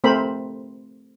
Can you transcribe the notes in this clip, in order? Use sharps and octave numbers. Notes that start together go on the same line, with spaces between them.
A3 C4 A#4 C5 B5